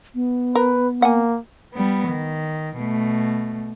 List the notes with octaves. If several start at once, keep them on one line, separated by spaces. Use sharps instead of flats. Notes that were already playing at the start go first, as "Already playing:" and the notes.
B3
A#4 B4
A#3 F#5 G#5
G3 B3
D#3
B2 A3